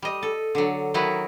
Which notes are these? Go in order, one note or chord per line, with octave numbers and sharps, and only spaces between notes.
G3 D#5
A4
D3 F#3
D#3 F#3 D#4 E4 F#4 B4